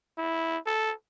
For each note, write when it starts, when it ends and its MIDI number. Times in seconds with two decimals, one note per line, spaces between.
0.18 0.58 64
0.66 0.93 69